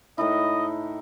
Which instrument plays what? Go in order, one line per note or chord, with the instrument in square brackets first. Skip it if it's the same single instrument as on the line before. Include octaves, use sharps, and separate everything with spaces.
[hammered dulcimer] A2 D#4 E4 [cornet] D#5